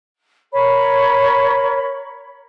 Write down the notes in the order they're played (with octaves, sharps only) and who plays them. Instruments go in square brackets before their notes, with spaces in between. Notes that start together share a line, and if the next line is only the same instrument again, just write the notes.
[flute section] A#4 C#5 B5